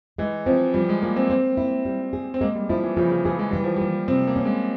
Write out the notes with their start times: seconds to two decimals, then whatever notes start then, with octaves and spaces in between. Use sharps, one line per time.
0.18 E3 G#3
0.46 F3 C4
0.74 F3 G3
0.89 G#3
1.02 F3 A#3
1.16 C4
1.29 A#3 C4
1.57 E4
1.85 G3
2.13 G#4
2.34 C4
2.41 G#3 A#3
2.55 G3
2.69 F3 E4
2.84 E3
2.97 C#3 F3
3.12 C#3
3.25 E3 G#4
3.39 G#3
3.51 E3 G3
3.64 F3
3.76 G3 A#3
4.08 C3 C4
4.28 A#3
4.36 C#4
4.45 G#3